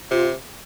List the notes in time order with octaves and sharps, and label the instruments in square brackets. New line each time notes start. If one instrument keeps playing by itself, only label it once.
[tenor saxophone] C3 [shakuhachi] F4